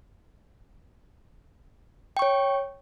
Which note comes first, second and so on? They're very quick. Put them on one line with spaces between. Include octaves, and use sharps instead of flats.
G5 C#6 C#5